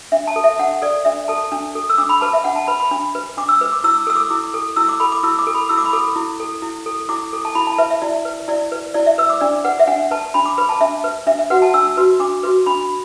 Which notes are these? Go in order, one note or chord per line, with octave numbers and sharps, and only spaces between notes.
D4 E5
A5
A4
E5
D4 F#5
A4 D5
D4 E5
A4 A5
D4
A4
E6
D4 D6
B5
B4 A5
E5
D4 F#5
A5
B4 B5
B5
D4
B4
D4 D6
E6
B4
D6
E4 E6
A4 E6
D6
E4 D6
A4
E4 E6
D6
A4 B5
D6
E4 E6
D6
A4
B5
E4 E6
D6
B5
A4 D6
E4
A4
E4
A4
E4 D6
A4
A5
E4 B5
A5
B4 E5
E5
E4 D5
B4
E4 D5
B4
E4 D5
E5
B4 E6
D6
D4 D5
B4 F#5
E5
D4 F#5
B4 A5
D4 B5
D6
B4 B5
A5
D4 E5
B4
D4 E5
E5
F#4 B4 F#5
A5
D4 E6
F#4 B4
D4 D6
F#4 B4
D4 B5